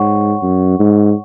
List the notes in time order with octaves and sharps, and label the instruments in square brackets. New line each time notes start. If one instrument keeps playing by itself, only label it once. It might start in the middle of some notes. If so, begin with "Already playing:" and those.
Already playing: [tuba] G#2 [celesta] C#5 F#5 C#6
[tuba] F#2
G#2